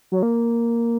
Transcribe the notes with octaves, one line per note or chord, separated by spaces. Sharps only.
F#3
A#3